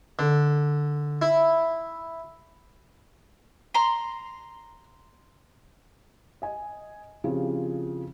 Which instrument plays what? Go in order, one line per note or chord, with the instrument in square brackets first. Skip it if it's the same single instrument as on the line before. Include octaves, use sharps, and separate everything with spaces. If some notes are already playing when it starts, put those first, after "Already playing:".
[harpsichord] D3
E4
[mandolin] A#5 C6
[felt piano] D#5 G#5
C#3 F3 C4 E4 F4 G4